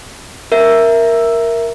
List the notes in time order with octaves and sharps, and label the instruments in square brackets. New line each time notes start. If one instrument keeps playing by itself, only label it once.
[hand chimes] A#4 E5